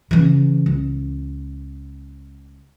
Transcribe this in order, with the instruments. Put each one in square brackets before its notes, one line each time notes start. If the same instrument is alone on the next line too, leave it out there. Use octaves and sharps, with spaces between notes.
[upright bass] C#3 E3
C#2